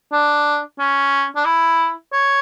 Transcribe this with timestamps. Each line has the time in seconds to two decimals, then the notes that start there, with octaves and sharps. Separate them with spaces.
0.12 D4
0.79 C#4
1.36 D4
1.45 E4
2.13 C#5